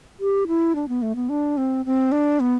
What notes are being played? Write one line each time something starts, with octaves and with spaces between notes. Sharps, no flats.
G4
E4
D4
B3
A3
B3
D4
C4
C4
D4
B3